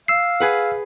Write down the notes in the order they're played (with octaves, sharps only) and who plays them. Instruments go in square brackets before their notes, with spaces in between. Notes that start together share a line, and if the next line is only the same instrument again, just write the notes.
[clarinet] F5 [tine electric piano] E6 C7
[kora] G#4 B4 F#5